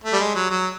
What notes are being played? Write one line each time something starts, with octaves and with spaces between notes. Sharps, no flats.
A3
G3
G#3
F#3
F#3